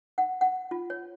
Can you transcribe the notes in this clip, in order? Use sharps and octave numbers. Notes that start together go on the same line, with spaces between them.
F#5
F#5
F4
C#5